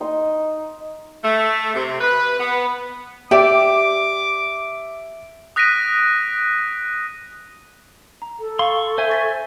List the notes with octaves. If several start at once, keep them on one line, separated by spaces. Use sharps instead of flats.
D#4 D#5 C6
A3
C3
B4
B3
G4 D5 E5 D6
D#6 F#6 A#6 B6 D7 D#7
A#5
A4
F5 C6 C#6
C5 E5 G#5
C#6 A6 B6